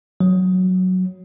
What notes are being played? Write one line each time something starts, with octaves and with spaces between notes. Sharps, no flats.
F#3